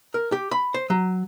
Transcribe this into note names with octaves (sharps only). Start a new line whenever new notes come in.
A#4
G4
B5
C5
F#3